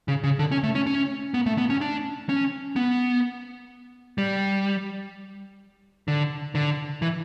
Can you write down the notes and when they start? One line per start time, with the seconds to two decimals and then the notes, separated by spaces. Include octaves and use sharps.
0.08 C#3
0.24 C#3
0.39 D3
0.52 C#4
0.64 A3
0.75 C#4
0.87 C#4
1.34 B3
1.46 A3
1.58 B3
1.70 C#4
1.81 D4
2.29 C#4
2.76 B3
4.18 G3
6.08 D3
6.55 D3
7.02 E3